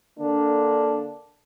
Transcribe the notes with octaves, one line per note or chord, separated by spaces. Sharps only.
D3 A#3 D4